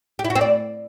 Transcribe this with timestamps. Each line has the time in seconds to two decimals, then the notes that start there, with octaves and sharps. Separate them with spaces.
0.19 G4
0.25 E4
0.30 F#4
0.35 C4
0.41 D5